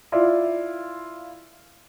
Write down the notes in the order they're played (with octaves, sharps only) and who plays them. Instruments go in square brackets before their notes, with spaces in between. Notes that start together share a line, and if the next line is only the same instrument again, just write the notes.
[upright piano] E4 F4 D5